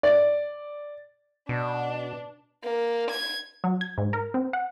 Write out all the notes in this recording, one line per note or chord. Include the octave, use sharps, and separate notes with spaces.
D5
B2 D4
A#3
G#6
F#3
G#6
G#2
A#4
C4
F#5